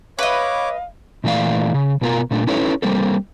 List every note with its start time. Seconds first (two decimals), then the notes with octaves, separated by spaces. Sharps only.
0.19 B4 C#5 D#5 F5 D6
1.24 A#2 E3 A3 D5 F5
1.74 C#3
2.01 B2 B3 F4 A4 A#4
2.31 A#2 A3 D4
2.47 C#4 D#4 E4 A4 B4 C#5
2.82 G3 A#3 C4 A4